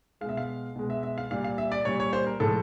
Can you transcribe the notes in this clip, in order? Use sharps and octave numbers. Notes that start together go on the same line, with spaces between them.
B2 G#3 E5 F5
F5
B2 G#3
E5
E5
F5
A#2 G3 F5
F5
E5
D5
A#2 G3 C#5
C#5
C5
A#4
A2 F3 G#3 A4